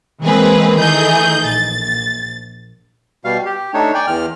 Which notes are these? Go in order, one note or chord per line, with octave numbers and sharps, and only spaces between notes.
E3 G#3 A#3 C4 G#4 B4
D#3 E3 A3 D#4 G#4 G6
A#1 A6
B2 G3 F5
G4
A3 D4 D#4 C#5
D5 G5 G#5
E2 F6